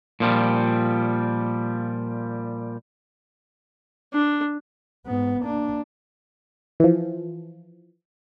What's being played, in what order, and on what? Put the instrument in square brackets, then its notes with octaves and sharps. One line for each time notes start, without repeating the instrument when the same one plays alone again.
[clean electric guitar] A#2 F3 G3
[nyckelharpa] D4
[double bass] G#2 B3
A#3 D4
[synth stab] E3 F3